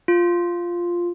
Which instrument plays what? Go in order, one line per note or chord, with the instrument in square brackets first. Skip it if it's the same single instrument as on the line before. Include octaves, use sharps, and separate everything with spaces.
[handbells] F4